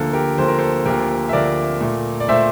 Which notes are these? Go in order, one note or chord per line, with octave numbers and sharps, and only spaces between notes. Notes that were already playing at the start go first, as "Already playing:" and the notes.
Already playing: D2 D3 F3 A#3 A4
G4 A#4
D2 D3 F3 A#3 C5
A#4
A4 C5
D2 D3 F3 A#3 G4 A#4
E5
D2 D3 F3 A#3 A#4 D5
A#2 A3
D5
A#2 A3 C5 E5